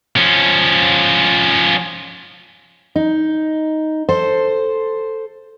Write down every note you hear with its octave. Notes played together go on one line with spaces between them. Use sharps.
F3 C#4
D#4
A4 C5